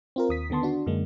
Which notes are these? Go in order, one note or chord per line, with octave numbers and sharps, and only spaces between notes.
C4 F4 A#4
D#2 D#6 B6
D3 D#3 B3 A5 C6
D4 F#4
F#2 D3 G#3 A#3